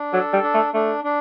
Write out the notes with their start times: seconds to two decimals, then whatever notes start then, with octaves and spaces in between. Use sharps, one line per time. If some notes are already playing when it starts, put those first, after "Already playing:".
Already playing: D4
0.13 F#3 A4
0.33 G3
0.43 D4
0.54 A3
0.74 A3 D4
1.04 D4